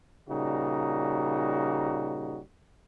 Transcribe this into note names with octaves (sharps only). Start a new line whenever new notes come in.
A#2 C#3 G3 D#4 F#4